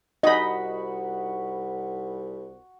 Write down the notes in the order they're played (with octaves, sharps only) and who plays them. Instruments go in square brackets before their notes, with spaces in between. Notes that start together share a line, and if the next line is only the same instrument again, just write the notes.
[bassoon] C2 [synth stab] D#4 B5 [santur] F#4 [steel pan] D#5